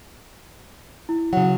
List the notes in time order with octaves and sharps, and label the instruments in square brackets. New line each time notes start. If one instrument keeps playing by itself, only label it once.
[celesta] E4
[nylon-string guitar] C#3 F#3 [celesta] F#5